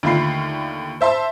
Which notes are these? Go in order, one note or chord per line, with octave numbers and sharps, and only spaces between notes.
D#2 D3 A3 F4 B5 C7
C5 E5 A5 C6